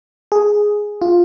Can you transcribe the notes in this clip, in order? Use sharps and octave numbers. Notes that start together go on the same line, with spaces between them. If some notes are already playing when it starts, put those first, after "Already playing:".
G#4
F4